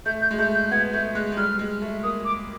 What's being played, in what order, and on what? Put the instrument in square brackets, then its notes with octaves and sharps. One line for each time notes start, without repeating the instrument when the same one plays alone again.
[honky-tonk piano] A3 [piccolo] G6
[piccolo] G6
[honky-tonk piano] G#3
[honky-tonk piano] A3 [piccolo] G6
[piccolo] G6
[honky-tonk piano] B3 [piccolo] G#6
[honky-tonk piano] A3 [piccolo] G6
[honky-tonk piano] G#3 [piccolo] F#6
[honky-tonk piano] G#3
[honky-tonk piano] G3 [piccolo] F6
[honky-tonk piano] G#3
A3
[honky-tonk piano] A#3 [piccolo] D#6
[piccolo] D6